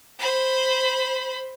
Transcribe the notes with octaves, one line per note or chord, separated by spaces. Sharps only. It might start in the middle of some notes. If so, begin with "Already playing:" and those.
C5 B5